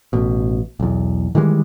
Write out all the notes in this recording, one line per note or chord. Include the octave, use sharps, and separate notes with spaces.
A1 B2
B1 E2
D#3 E3 G3 G#3